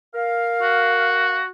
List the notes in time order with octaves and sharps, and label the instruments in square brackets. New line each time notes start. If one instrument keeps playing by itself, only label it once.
[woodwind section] A#4 F5
[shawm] F#4